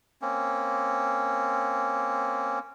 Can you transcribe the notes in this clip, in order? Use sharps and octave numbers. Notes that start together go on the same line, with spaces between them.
A#3 C4 C#4